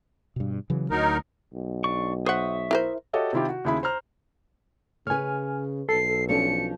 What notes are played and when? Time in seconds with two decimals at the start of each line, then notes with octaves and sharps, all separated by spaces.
0.36 G2 B2
0.70 C#3 E3 F#3
0.90 D2 F#3 D#4 A#4
1.54 B1
1.84 D4 C#6
2.26 C5 E5 F#5 C#6 D#6
2.71 E4 A#4 C5
3.13 F#4 G4 A4 C#5 D#5 E5
3.33 C3 D#3 E4 F4 G4
3.49 F#4
3.65 D#2 C#3 E4 G#4 B5
3.83 C5 A#5 F6
5.07 C#3 C#4 B4 G#5 F6
5.89 B1 A4 C7
6.29 F3 C#4 D4 C#7